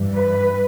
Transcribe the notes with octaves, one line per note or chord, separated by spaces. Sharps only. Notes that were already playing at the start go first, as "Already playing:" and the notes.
Already playing: G2 E3 G3
B4